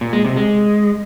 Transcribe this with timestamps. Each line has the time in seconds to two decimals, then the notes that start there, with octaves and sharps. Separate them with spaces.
0.01 A#2
0.13 G#3
0.25 C3
0.36 G#3